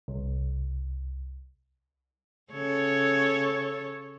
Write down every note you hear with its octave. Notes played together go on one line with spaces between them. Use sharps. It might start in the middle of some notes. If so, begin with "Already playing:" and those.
C2
C#3 A4 C#5